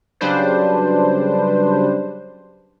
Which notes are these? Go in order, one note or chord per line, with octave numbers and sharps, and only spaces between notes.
C#3 F#3 G3 D4 B4 C5